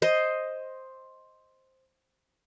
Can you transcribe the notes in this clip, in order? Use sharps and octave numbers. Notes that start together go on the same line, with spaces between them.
C5 D#5